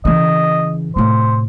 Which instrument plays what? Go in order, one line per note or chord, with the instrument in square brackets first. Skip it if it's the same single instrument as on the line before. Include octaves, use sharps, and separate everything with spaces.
[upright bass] C#3 E3 [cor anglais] D#5
[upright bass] A2 C3 [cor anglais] C5